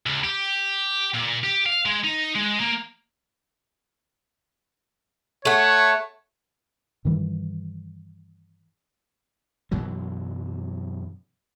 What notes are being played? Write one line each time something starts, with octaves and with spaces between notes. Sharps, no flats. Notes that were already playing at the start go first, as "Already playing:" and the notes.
C#2
G4
A#2
G4
F5
G#3
D#4
G#3
A#3
A3 C#5 F#5
G2 D#3 E3 G3
F#2 B2 E3 F#3